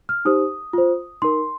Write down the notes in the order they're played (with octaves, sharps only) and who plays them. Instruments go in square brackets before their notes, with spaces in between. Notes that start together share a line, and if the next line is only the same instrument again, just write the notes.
[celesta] F6
D#4 G4 C5 D#6
F4 C5
D#4 A#4 C6